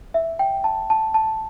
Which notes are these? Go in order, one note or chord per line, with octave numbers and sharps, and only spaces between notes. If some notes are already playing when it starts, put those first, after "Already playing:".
E5
G5
A5
A5
A5